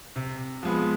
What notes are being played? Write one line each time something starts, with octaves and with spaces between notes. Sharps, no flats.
C3
F3 G#3 B3